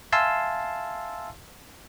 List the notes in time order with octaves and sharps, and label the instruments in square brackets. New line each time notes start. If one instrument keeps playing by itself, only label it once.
[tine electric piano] E5 F5 G#5 A5 C6 E6